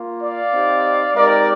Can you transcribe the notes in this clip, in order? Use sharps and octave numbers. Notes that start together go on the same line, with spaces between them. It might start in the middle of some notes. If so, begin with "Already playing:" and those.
Already playing: A#3 F4
D5 F5
C4 D#4 G4
G#3 C4 D#4 G4 A#4 D5